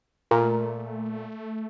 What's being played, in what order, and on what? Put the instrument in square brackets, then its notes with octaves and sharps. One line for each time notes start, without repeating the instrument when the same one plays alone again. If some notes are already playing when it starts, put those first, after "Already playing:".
[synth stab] A#2 [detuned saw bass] A3 [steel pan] A#4